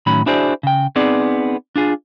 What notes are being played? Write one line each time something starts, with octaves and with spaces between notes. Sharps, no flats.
A2 D#3 F#3 C#4 B5
D4 E4 F#4 G#4 C5 D5
C#3 G5
B3 C4 D#4 G#4 D5
D4 F4 G#4